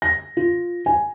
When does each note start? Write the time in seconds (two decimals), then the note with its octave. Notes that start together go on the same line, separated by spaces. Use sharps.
0.02 A#6
0.37 F4
0.86 G#5